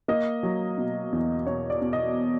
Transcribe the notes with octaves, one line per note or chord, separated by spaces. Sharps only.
A#3 D#5
F#3
B2
E2
B2 C#5
D5
B2
D#5